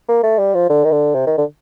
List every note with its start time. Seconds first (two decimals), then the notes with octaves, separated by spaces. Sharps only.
0.09 A#3
0.23 A3
0.39 G3
0.54 F3
0.70 D3
0.85 D#3
0.92 D3
1.15 C3
1.27 D#3
1.38 D3